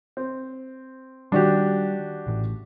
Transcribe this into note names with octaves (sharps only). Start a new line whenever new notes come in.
C4
D#3 G3 D4 F#4 G4
A1 A2